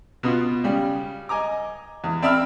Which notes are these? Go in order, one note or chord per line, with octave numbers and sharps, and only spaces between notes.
B2 B3 F4
C#3 G3
D#5 G#5 A#5 D6
E2
C4 D5 E5 B5 E6 F6